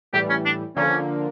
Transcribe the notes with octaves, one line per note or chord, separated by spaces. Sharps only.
A2 E3 G3 G4
C#4
D4
D3 F3 A#3 C#4